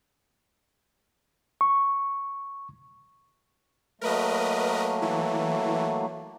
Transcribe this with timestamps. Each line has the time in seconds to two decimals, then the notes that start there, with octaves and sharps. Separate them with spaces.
1.61 C#6
4.01 F#3 A3 A#3 A#4 B4 D#5
5.02 E3